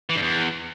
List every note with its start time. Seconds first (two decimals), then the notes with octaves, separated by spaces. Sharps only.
0.10 E3
0.16 G2
0.22 E2